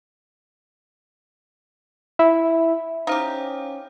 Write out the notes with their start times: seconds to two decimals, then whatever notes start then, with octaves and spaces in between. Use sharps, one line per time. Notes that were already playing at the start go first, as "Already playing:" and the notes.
2.19 E4
3.07 C#4 D#4 G4 C5 F5